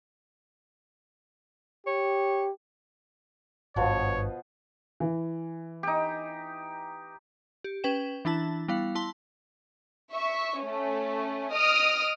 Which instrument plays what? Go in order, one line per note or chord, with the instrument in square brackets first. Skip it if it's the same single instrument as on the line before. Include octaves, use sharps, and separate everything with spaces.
[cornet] G4 [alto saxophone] C#5
[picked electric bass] G#1 G2 [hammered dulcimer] B2 F3 B3 [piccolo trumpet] C#5
[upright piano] E3
[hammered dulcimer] D#4 G4
[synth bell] G4
C#4 B4 G5 E7
E3 D4 E4 A5
G3 B3 E4 F5
E4 A5 C6 G7
[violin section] E5 C#6
A3 C#4
D#5 D#6 F6 D7